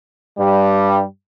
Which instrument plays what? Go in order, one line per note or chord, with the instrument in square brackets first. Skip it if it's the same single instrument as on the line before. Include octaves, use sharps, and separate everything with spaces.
[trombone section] G2 G3